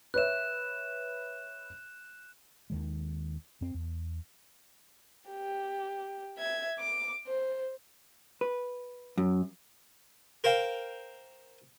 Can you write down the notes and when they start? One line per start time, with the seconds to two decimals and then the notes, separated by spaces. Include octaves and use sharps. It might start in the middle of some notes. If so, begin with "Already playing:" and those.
0.14 B4 C#5 E5 F#6 E7
2.70 D#2 D#3 G#3
3.61 F2 C4
3.74 E2
5.30 G4
6.38 E5 G#6
6.79 D6
7.27 C5
8.41 B4
9.18 F#2
10.44 A#4 C5 F5 G5